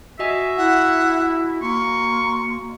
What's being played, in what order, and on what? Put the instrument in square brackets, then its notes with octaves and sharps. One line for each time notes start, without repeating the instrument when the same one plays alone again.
[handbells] F#4 D#5 G#5 [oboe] E5
[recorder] E4 [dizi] F#5
[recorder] A#3 [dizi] C6 [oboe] C#6